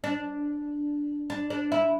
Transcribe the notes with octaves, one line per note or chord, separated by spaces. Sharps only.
D4
D4
D4
E4